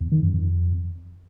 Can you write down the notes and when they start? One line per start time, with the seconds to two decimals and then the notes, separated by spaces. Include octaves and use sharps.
0.01 E2
0.12 D#3
0.23 F#2
0.34 F2